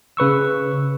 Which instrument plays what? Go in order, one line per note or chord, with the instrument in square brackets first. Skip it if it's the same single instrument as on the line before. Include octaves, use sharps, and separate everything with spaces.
[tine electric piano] C#3 B4 C#6 E6